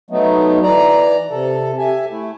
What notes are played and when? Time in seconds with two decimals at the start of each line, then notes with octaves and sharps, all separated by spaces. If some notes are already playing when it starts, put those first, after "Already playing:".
0.10 F#3 A3 B3 D#4
0.63 E3 D5 A#5
1.31 C3 A4
1.78 G4 E5 G#5
2.12 A3 E4